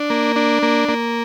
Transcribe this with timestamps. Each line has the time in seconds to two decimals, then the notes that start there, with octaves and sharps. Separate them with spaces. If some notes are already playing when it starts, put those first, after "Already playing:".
Already playing: D4
0.10 A#3
0.36 D4
0.63 A#3
0.89 A#3